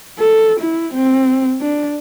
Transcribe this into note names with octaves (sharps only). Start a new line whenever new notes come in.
A4
E4
C4
D4